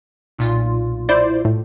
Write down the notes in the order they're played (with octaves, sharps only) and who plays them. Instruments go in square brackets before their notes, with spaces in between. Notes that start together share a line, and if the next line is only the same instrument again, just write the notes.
[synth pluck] B1 A#2 F4
[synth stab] E4 C5 D5
A2